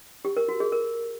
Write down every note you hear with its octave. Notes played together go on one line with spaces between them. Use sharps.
G4
A#4
F#4
G#4
A#4